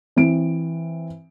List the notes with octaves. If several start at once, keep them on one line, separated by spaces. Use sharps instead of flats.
E3 C4 D7